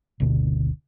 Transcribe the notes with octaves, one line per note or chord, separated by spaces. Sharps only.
F#1 D2 B2 D3